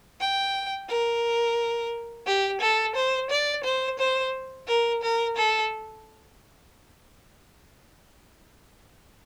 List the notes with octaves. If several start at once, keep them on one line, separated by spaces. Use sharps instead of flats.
G5
A#4
G4
A4
C5
D5
C5
C5
A#4
A#4
A4